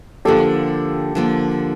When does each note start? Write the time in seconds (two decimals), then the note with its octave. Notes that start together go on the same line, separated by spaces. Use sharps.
0.25 D3 F3 A#3 G4 A4
1.15 D3 F3 A#3